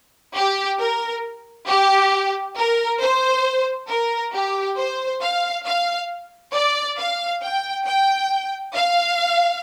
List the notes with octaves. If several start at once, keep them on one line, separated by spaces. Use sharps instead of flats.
G4
A#4
G4
A#4
C5
A#4
G4
C5
F5
F5
D5
F5
G5
G5
F5